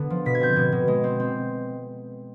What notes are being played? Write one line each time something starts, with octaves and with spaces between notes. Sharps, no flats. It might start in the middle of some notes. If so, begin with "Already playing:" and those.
Already playing: D3 B3
F3
B2 B6
G#6
C4 G6
B2 G#6
B2
G#3
C4
C4